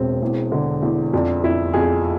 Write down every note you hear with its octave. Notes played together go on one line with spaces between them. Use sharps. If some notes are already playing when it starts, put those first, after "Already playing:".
Already playing: E1 C4
E2
D3
E2
F2 D4
F2 E4
F2 G#4